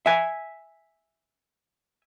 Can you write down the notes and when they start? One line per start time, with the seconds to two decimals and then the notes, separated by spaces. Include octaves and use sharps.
0.06 E5 G#5